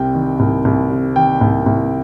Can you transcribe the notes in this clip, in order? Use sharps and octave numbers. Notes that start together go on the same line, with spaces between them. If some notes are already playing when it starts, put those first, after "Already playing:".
Already playing: C2 C3 G5
D#3
C2
C2
C3
D#3 G5
C2
C2